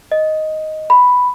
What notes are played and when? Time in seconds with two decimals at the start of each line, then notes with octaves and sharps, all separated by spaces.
0.12 D#5
0.90 B5